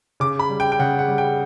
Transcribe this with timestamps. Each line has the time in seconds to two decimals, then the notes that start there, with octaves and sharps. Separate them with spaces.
0.20 C#3 D6
0.39 B5
0.50 G3
0.60 G5
0.72 G5
0.79 C#3 F#5
0.99 F#5
1.08 G3
1.18 G5